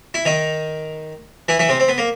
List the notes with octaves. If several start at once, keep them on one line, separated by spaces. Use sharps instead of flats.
E4
D#3 D#4
E3 E4
E3 E4
C3 C4
C4
B3
A#3